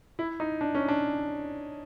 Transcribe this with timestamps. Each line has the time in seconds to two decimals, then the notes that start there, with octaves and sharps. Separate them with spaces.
0.19 E4
0.40 D#4
0.61 D4
0.75 C#4
0.88 D4